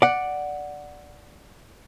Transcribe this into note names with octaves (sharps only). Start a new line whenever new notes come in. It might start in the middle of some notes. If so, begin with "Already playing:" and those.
D5 F#5